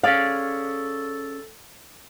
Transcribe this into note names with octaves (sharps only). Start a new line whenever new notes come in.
C#4 G#4 A4 D5 F5